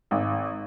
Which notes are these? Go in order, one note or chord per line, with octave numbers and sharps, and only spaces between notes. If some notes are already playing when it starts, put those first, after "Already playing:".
G#1